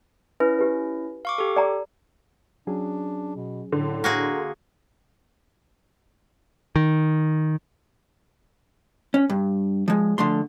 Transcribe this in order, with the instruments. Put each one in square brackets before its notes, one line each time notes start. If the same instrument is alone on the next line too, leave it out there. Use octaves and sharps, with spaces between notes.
[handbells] C#4 E4 [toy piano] B4
[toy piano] G4 B4
[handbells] F5 C#6 D6
G4 A4
[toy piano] D5 G5 A#5
[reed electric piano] F#3 C#4 G#4 [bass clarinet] D4
[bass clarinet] B2
[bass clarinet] A2 [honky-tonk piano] D3
[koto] A#3 F#4 G#4 [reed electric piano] F#5 A#5
[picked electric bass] D#3
[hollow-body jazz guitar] C#4
G2
F3 G#3
D3 F3 A3 C6